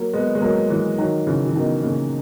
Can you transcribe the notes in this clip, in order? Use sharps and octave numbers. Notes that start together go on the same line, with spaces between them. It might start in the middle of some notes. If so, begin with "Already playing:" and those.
Already playing: F#3 A#3
G#3 B3
G#3
F#3 A#3
E3 G#3
D#3 F#3
C#3 E3
E3
B2 D#3
A#2 C#3